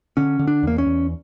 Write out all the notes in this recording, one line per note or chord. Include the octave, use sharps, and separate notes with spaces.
D3 C#4
D3
D4
E2 A#3
C#4
E2